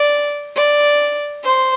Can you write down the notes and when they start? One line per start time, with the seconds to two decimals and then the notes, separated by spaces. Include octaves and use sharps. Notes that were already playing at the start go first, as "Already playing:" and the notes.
Already playing: D5
0.56 D5
1.44 C5